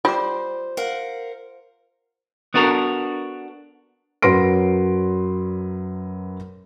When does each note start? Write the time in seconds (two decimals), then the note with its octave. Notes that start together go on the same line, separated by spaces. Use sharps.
0.05 G3 F4 C5 D6
0.77 A#4 F5 F#5
2.54 B3 D4 F#4 A4 A#4
4.22 F#2 F#3 B4 C6 A#6 D7